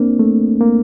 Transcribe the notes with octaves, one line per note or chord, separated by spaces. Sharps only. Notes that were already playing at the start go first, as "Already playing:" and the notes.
Already playing: A#3 C4 D4
A3
A#3